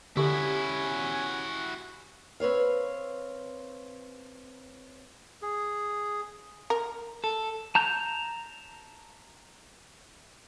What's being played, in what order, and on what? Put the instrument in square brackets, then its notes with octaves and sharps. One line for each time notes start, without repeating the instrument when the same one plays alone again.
[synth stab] D3 [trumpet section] C#4 G#5 [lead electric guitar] E4 F#4 [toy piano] G4 A4
[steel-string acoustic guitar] C4 B4 C#5 F5
[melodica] G#4
[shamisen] A#4
[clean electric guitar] A4
[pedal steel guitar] A5 A#5 G6